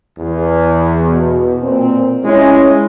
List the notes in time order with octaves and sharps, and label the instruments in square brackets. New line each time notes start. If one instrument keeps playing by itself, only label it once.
[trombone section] E2
[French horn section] B2
A#2 C4
[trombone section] G#3 [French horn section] C#4 E4